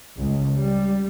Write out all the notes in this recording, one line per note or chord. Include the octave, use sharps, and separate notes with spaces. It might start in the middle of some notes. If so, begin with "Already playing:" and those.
C#2
G3